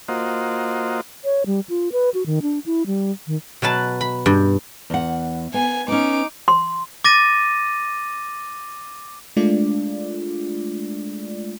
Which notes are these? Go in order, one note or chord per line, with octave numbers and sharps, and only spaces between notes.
A#3 F4 F#4 C5 D#5
C#5
G3
F4
B4
F#4
D#3
D4
E4
G3
D#3
B2 F#3 B4 A5
B5
G2
E2 F#5
B3 G#5
B3 C#4 D#4 D6
C6
D6 A6 A#6 D#7
G#3 A3 D4 F4 D5